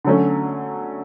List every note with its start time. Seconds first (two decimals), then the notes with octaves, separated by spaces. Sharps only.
0.04 D3 F#3 A3 C#4